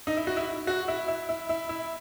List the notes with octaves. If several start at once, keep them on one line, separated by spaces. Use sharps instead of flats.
D#4
E4
F#4
E4
F#4
E4
E4
E4
E4
E4